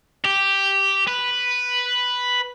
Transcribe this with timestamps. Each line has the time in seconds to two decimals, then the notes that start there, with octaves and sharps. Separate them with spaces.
0.25 G4
1.07 B4